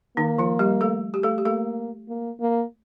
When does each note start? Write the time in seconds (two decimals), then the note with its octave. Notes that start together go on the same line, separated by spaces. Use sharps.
0.17 D#3 A#3 D#4
0.38 F3 F4
0.59 G3 G4
0.81 A3 A4
1.14 G4
1.23 A3 A4
1.38 G4
1.45 A3 A#3 A4
2.09 A#3
2.40 A#3